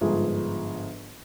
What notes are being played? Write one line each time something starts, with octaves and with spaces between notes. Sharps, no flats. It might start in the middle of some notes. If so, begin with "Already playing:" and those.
G1 G#2 F3 G#4